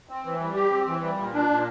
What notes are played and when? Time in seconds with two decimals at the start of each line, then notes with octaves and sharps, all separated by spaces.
0.09 C4
0.25 E3
0.40 G3
0.55 G4
0.71 C4
0.87 E3
1.01 G3
1.17 A#2
1.34 D4
1.49 A#2